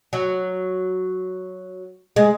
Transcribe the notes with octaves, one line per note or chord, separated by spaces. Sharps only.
F#3
G#3